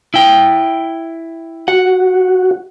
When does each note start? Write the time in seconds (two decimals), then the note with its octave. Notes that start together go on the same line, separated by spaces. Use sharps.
0.14 E4 G5
1.68 F#4 F#5